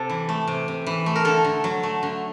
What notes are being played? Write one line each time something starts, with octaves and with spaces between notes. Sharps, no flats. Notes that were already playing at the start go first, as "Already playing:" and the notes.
Already playing: C3 A4
E3
A3
C3
C3
E3
A3
A#4
D3 A4
D3
F#3
A3
D3